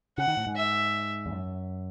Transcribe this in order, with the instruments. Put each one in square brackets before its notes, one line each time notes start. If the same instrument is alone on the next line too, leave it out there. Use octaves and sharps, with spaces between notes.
[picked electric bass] C#3 [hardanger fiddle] F#5
[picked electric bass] D#3
A2
G#2
[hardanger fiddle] E5
[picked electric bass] E2
F#2